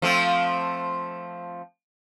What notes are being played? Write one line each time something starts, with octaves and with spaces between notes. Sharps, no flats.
F3 A3 C4